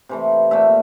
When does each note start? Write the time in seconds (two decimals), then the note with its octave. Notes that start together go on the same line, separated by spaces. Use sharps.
0.09 C3 E3 A3
0.51 A#2 A3 E5